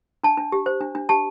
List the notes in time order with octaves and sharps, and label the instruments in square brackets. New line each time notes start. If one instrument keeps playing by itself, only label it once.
[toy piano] D4 A5
D4
G4
C5
D4
D4
G4 A5